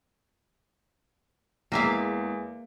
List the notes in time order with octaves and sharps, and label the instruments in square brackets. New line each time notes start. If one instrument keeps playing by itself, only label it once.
[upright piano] E2 G#3 [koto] A#3 E5 F5